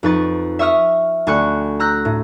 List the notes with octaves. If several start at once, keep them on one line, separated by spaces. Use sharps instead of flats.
F2 D#4 B4 C#6 A6
E5 C#6 D#6 F6
D2 A4 G#5 C#6 F#6 C#7
A#5 E6 F#6 G6 A#6
A2